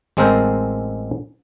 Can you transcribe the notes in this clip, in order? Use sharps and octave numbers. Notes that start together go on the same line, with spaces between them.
A1 G#3 C4 A4 A#4 C5